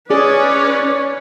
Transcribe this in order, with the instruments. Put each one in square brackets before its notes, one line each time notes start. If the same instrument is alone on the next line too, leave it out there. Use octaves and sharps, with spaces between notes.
[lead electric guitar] C#4 [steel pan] G#4 [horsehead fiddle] B4 C#5 [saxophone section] D5